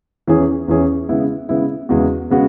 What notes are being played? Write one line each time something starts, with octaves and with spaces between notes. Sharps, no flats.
E2 E3 C#4 G#4
E2 E3 C#4 G#4
C#3 G#3 B3 E4
C#3 G#3 B3 E4
E2 C#3 G#3 B3 F#4
C#3 G#3 B3 F#4